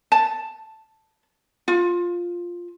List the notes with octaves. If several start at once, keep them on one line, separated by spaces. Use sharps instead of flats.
A5
F4